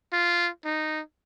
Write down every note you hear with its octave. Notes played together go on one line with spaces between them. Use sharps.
F4
D#4